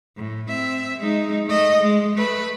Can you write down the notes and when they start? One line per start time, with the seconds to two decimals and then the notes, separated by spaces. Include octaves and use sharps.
0.17 A2
0.48 C4 E5
0.98 G#3 D#4
1.46 A3 D#5
1.81 G#3
2.16 A3 B4